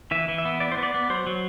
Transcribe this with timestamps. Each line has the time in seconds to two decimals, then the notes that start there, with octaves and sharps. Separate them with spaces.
0.11 E3 E5
0.28 E3
0.38 E5
0.45 B3
0.60 B3 D5
0.72 C5
0.77 B3
0.83 D5
0.94 B3
1.10 F#3 C5
1.27 F#3